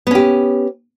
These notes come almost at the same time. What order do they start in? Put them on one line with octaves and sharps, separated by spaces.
B3 C#4 G4